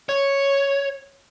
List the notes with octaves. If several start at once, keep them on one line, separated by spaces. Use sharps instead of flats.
C#5